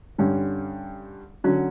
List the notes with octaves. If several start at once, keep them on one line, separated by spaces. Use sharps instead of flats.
G2 D3 G3 C#4
D3 F#3 C#4 F#4